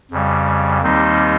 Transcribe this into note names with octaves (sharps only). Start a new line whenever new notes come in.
F2 C#3 G3
D#2 D#3 G3 C4 D#4